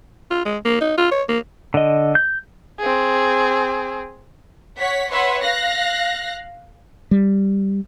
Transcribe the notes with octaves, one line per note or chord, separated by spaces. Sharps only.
F4
G#3
A#3
D#4
F4
C#5
A#3
D3 D#5
G6
C4 G#4
C#5 F#5 B6
B4 C#5 E5 F#5 C6
F5 F#6 A#6
G3